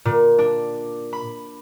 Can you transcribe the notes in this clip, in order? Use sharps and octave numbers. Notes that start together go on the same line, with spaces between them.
A#2
D4
B5